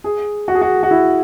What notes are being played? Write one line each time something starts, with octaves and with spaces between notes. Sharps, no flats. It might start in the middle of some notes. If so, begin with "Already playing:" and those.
G#4
F#4
G#4
F#4
F#4
E4